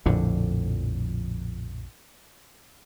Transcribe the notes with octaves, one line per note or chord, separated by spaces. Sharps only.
A#1 F2 A2 D3